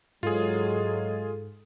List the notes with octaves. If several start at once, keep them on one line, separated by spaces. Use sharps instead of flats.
G#2 F#3 G#3 F4 G#4 A4